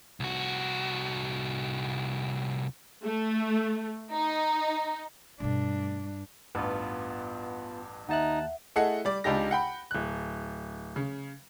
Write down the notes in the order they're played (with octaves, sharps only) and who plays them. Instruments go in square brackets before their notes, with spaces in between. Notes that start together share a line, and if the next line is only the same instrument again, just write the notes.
[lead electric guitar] C2 F#4
[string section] A3
D#4
[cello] G2 D4 [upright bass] B2 A3
[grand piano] A1 E2 G2 [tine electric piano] B3 F4
[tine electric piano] D#2 A5 F#6 [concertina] D#4 [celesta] E5 F#5
[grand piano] A3 E4 G#4 A4 D#5 F#5
G3 D5
C#2 D4 D#4 G4 A#6
F#5 G5 B5
D1 F#6
C#3